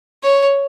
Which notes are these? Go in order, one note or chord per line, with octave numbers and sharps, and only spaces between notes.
C#5